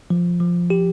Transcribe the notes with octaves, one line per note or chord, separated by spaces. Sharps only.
F3
F3
G4